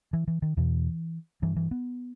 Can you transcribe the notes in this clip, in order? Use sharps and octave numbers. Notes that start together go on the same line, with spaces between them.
E3
E3
D#3
E2 B2 E3
G2 E3
E3
B3